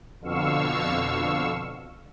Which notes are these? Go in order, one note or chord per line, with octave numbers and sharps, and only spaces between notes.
F2 B2 D3 F5 C#6 E6